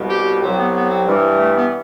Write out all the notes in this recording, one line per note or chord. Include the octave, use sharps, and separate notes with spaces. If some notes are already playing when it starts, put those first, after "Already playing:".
Already playing: C2 B2 G3
G4
C2 C3 F#3 C4
B3
B3
C4
G2 E3 G3
A3
B3